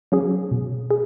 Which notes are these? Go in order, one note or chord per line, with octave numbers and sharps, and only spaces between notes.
F#3 C#4 G#4
B2
G#4